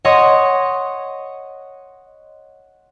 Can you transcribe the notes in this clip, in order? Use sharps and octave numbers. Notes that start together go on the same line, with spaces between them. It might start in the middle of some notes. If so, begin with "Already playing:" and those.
C#5 D#5 F#5 C6 D#6